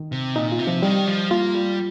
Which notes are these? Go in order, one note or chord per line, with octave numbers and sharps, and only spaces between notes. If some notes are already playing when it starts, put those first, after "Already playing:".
Already playing: D#3
C3
A#2 D#4
F4
C3
F3
D#3 G3
F3
A#3 F4
G3